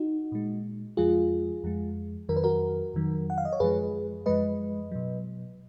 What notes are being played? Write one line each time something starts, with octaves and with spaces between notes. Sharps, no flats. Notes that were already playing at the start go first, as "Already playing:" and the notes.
Already playing: D#4 F#4
A#2 G#3
F2 F3 G#3 F4 G#4
F2 F3 G#3
F2 D#3 F#3 A#4
B4
F#4 A#4
F2 D#3 F#3
F#5
F5
D#5
C#5
F#2 F3 G#3 G#4 B4
F#2 F3 G#3 B4 D#5
B2 F#3